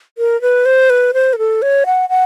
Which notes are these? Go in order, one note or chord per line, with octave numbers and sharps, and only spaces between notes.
A#4
B4
C5
B4
C5
A#4
A4
C#5
F#5
F#5